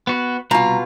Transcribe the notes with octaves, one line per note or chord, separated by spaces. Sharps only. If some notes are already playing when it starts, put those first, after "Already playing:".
B3 F#4
C2 B2 F4 A#5